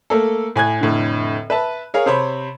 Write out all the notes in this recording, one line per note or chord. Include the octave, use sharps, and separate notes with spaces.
A3 A#3 A4
A2 G#5 F#6 G#6
F1 A2 D3
B4 E5 A5
G#4 A#4 C#5 F5
C3 C5 C#5 B5